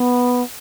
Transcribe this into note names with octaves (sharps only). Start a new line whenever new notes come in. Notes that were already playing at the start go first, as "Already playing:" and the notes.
Already playing: B3